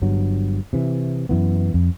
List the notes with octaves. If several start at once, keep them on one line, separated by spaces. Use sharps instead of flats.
G1 G2 F#3
C3 E3
F#2 E3 B3
F2